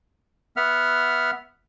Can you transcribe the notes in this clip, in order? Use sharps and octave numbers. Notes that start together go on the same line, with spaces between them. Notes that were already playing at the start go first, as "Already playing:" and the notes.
B3 E5 F#5 F6